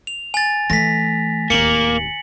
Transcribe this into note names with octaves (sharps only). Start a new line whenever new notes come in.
F7
G#5 A6
E3 A3 A#6 B6
D1 D#2 A#3 C#7 F#7